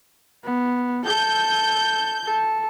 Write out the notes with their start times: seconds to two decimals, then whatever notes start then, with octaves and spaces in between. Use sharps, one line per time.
0.44 B3
1.05 A4 G6
2.25 A4